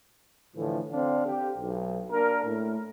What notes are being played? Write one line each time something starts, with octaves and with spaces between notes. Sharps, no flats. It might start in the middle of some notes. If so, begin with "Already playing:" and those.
A2 D3 E3 F3
D3 C4 D4 F5
G4
B1
A#3 D4 A#4
A2